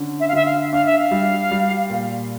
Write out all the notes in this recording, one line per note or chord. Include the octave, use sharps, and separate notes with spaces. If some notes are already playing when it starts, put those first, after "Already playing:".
Already playing: D3 C#4
E5
F5
D3 E5
F5
D4 F5
E5
F5
G3
G3
A#2